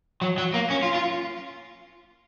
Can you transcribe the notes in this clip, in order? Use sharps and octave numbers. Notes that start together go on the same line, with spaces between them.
F#3
F#3
A#3
C#4
F4
F4